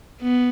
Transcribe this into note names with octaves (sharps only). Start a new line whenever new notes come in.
B3